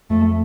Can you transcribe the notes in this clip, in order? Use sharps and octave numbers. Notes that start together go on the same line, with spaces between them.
F2 A3